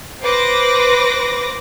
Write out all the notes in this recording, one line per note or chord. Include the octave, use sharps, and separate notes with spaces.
B4 C5 D6 A#6